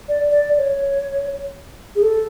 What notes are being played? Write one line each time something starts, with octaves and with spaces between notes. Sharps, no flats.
D5
D5
C#5
G#4
A4